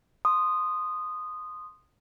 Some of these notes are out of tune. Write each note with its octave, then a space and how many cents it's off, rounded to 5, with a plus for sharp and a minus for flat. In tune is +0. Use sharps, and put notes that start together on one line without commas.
C6 +0 D#6 -10